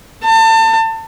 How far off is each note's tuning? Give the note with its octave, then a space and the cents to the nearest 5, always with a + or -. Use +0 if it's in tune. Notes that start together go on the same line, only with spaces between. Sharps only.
A5 +30